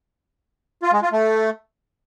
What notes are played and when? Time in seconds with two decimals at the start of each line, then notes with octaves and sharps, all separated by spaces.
0.83 F4
0.93 G#3
1.03 F4
1.12 A3